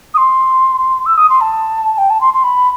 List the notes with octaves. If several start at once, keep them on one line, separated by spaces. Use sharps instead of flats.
D#6
C6
E6
D#6
C6
A5
G5
A5
C6
C6
B5